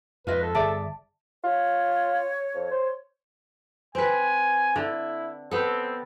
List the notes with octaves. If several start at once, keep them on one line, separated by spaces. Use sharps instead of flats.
F2 G#2 F4 B4 D#5
A4
G1 G#4 D5 E5 A5
F4 C#5
F2
C5
C4 B4 G#5
D3 E4
B3 C4 A4